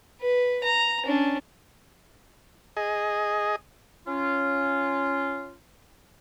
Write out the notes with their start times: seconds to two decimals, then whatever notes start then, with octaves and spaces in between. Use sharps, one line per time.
0.21 B4
0.64 A#5
1.06 C#4 D4
2.77 G#4 D#5
4.08 C#4 F4